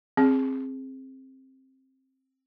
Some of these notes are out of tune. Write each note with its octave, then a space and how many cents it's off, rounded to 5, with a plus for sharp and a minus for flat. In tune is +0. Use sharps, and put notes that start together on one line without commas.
C4 +15 G#4 +0